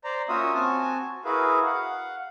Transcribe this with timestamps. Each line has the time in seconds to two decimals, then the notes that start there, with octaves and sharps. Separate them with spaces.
0.04 C5 D5 A#5
0.29 A#3 C#4 F4 F#4 E5 D#6
0.54 C4 F#4 G#5 A5
1.25 E4 F#4 G#4 A#4 B4 F5
1.66 F5 F#5